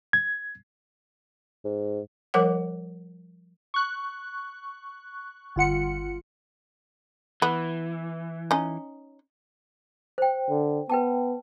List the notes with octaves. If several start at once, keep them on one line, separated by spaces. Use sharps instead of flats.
G#6
G#2
F3 G3 A#4 C#5 F#5
C#6 F#6
G1 F4 F#5 C#7
E3 B3
C#4 D#4
C5 G5
D3
B3 B4 G5 A5